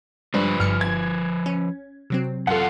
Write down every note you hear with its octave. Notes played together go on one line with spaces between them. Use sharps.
G2 F3 B4 C5
G1 G2 F6 C#7
G#6
C#4
C3 F#3 C4
F#2 F4 A4 F#5